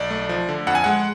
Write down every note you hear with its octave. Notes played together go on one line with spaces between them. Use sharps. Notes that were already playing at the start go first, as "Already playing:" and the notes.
Already playing: B1 D5
A3
F3
D3
F2 F#5
G#5
G#3 F#5